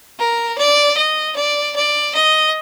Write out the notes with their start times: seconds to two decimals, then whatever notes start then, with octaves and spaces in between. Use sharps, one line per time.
0.19 A#4
0.58 D5
0.97 D#5
1.36 D5
1.76 D5
2.15 D#5